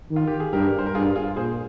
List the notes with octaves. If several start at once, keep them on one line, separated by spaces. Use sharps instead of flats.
D#3
F4
G4
G#4
G2 G4 A#4
C5
A#4
G2 F4 G#4
F4 G#4
A#2 G#4 C5